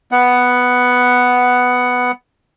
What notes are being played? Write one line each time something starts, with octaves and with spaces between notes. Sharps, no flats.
B3 F#5